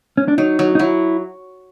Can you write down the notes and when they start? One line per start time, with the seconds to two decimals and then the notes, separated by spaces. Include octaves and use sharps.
0.17 C#4
0.28 D4
0.38 F#3 D#4
0.59 F#3
0.75 D#4
0.79 F#3 E4